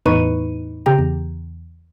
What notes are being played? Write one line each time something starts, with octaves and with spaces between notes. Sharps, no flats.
E2 A2 D#4 B4 C#6 D#7
C#3 G4 G5 A#5
E2